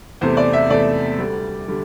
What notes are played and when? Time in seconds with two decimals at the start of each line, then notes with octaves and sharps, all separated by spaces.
0.21 E2 C3 A3 C5
0.37 D5
0.53 E5
0.70 E2 C3 A3 D5
1.18 D2 D3 G3
1.68 D3 G3